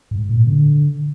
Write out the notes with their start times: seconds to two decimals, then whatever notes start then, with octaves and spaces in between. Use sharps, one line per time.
0.11 G#2
0.29 A#2
0.47 D3